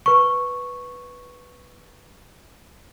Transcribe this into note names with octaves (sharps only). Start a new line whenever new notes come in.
B4 C#6